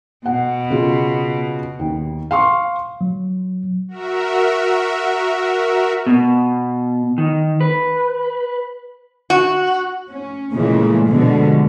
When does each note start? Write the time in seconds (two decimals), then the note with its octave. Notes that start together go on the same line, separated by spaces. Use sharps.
0.26 B2 F#5
0.70 C#3 F4
1.79 D#2
2.31 F5 C6 C#6
3.01 F#3
3.88 F#4 A#4 E5
6.07 B2
7.18 D#3
7.61 B4
9.30 F#4
10.10 C#4
10.52 A#2 C#3 E3 G#3 A3
11.09 B2 D3 F3 G#3